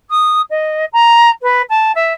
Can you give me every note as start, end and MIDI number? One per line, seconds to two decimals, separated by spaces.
0.10 0.41 87
0.50 0.85 75
0.93 1.30 82
1.42 1.61 71
1.69 1.91 81
1.95 2.13 76